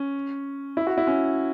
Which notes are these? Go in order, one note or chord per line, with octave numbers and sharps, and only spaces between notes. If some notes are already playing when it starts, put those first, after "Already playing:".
Already playing: C#4
E4
F#4
E4
C#4